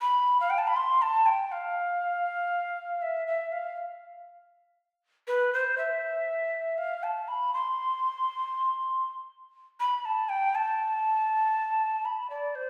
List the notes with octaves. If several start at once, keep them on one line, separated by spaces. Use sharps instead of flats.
B5
F5
G5
A5
B5
C6
A5
G5
F5
E5
E5
F5
B4
C5
E5
F5
A5
B5
C6
B5
A5
G5
A5
B5
D5
C5